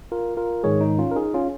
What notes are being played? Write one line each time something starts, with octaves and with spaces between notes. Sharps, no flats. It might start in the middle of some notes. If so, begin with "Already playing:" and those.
F4 A#4
F4 A#4
G#2 D#3 G#3 G#4 C#5
D#4
C#4 F4
A#4
D#4 G#4
C#4 F4